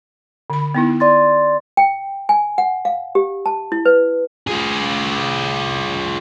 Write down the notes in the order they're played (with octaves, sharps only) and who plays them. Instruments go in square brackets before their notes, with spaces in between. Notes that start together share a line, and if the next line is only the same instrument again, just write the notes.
[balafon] D3 B5
B3 D#4 E4
[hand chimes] D5 C6 A6
[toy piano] G5
G#5
F#5
F5
G4
A5
E4
B4
[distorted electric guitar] F4 G#4